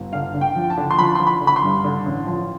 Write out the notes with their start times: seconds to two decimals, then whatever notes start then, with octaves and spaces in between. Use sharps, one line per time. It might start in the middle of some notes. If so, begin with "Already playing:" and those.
Already playing: G1
0.13 D3 F5
0.34 D3
0.41 G5
0.56 F3
0.70 A5
0.78 D3
0.91 C6
0.99 F3 B5
1.15 F3 C6
1.27 B5
1.41 D3
1.47 B5
1.56 C6
1.63 G2
1.85 D3
2.06 A1
2.27 F3